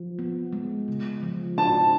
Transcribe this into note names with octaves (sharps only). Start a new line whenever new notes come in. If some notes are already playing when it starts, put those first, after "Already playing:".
Already playing: F3
B3
G#3
C#3
F3
D4 A5